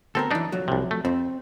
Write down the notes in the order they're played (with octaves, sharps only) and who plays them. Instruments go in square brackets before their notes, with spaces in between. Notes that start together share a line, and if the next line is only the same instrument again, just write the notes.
[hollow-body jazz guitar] D2 B3 A#4 [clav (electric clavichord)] C4 A4
[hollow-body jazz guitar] F#2 E3 [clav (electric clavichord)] D4 D#4
[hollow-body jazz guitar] F2 F#3
[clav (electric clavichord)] C2 C3
A3
[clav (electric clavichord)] F2 [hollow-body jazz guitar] C4